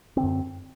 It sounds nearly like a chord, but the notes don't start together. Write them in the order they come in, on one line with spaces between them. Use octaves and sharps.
C4 D3 F#2